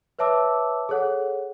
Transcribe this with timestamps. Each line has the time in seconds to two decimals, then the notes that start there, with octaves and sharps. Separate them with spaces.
0.19 B4 C#5 E5 A5 D6 E6
0.89 G#4 A4 C#5 F#5